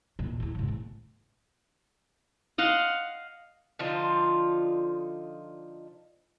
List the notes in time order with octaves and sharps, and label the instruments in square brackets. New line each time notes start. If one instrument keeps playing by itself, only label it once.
[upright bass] E2 A#2
E2 A2
G#2 C#3
A2 A3
[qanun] D#5 F5 F#5 C6
[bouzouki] D3 F3 D#4 F4